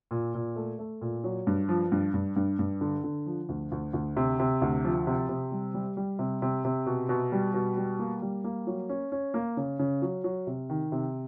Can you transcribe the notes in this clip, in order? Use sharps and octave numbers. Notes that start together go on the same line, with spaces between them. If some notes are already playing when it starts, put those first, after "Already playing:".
A#2
A#2
A3
A3
A#2
F#3
G2
F3
G2
G2
G2
G2
D3
D3
F3
D2
D2
D2
C3
C3
D2
F3
C3
C3
G3
G3
G3
C3
C3
C3
B2
B2
G3
B2
G3
A#3
G3
A#3
F#3
C#4
C#4
A#3
C#3
C#3
F#3
F#3
C3
D#3
C3